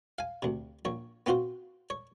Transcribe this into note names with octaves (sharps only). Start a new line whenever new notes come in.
F5 G#5
D2 C3
A#1 C#5
B3 C4 F4 F#4 C5
C#5